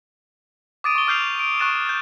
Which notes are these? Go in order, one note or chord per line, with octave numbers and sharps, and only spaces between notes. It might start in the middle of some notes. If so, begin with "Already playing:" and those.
D6 D#6 A6 D7 D#7
C#6 G7
D6 F6 G6 C7 F7
D7
C#6 D6 F#6 A6 D#7 E7
G6 A6